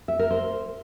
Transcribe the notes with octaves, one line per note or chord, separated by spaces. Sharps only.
E5
A#4
C5